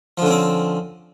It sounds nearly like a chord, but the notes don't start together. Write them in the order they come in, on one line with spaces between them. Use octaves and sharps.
F3 D3 C#4 C4